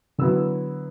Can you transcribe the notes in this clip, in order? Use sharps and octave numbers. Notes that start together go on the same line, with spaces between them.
D3 F#3 B3 E4 E6